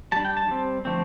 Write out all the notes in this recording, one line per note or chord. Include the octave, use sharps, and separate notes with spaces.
G3 D4 A5
G5
A5
G3 C4
D3 F3 A3 C4